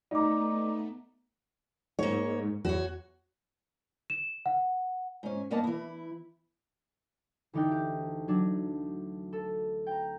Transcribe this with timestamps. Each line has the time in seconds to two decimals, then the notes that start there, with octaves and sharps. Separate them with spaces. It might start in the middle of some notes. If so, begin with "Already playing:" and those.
0.11 A3 B3 D#4 D5 D#5 A#5 D6
1.99 G#2 A#3 C#5
2.65 E2 F#4 C#5
4.10 E7
4.46 F#5
5.23 G#2 C#4
5.51 G2 A#3 B3 D#5 F5 A5
5.64 E3 E4
7.53 D2 E3 D#4 D5 G5 F#6
7.71 G4
8.28 F#3 D4
9.33 A4
9.87 G5 A#5